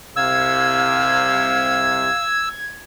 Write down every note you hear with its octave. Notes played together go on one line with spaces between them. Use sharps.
C2 C3 F5 E6 G#6